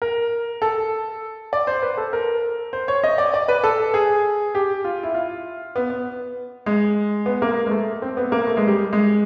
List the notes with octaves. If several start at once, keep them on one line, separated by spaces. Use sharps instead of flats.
A#4
A4
D5
C5
B4
A4
A#4
C5
C#5
D#5
D5
D5
B4
A4
G#4
G4
F4
E4
F4
B3
B3
G#3
B3
A#3
G#3
A3
C4
B3
A#3
A3
G#3
G3
G#3